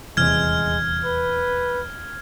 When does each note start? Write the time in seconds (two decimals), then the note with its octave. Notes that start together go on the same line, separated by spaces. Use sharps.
0.17 D#1 E2 C3 G#3 F6 G#6
1.04 B4